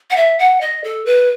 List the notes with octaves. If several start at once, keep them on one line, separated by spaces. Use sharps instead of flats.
F#5
E5
F#5
D#5
A4
B4